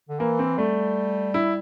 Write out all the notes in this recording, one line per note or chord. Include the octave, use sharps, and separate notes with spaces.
D3
E3 A#3
C4
G3 A3
E4